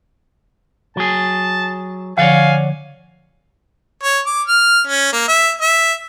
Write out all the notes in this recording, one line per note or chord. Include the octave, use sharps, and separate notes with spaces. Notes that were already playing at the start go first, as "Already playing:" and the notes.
F#3 G#4 A5
D3 F3 C#5 D5 F5 F#5 G#5
C#5
D6
F6
C#4
A#3
E5
E5